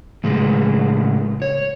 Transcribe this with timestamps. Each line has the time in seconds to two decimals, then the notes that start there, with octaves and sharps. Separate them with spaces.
0.24 A2 C#3 G#3 A3
1.42 C#5